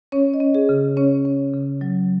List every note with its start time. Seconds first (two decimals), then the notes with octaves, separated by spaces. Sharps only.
0.12 C#4 C#5
0.34 D#5
0.40 C#4
0.55 G#4
0.69 C#3
0.97 C#4 C#5
1.25 C#4
1.54 C#3
1.81 F#3